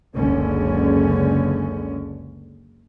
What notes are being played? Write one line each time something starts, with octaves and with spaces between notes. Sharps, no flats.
F#1 C#2 D3 C#4